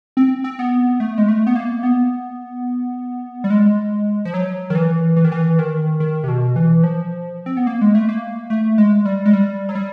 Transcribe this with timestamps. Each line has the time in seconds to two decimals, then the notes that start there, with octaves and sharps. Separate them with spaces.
0.17 C4
0.44 C4
0.59 B3
1.00 A3
1.18 G#3
1.28 A3
1.47 B3
1.56 A#3
1.83 B3
3.44 G3
3.50 G#3
4.25 F3
4.34 F#3
4.70 D#3
4.75 E3
5.16 E3
5.24 D#3
5.32 E3
5.59 D#3
6.00 D#3
6.24 C3
6.28 B2
6.56 E3
6.84 F3
7.46 C4
7.57 B3
7.67 A#3
7.81 G#3
7.95 A3
8.09 A#3
8.50 A3
8.78 G#3
9.05 G3
9.26 G#3
9.33 G3
9.69 F#3
9.75 G3